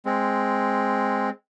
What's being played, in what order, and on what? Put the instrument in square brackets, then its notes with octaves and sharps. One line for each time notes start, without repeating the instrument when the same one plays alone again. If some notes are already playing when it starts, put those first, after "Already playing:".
[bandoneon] G#3 C4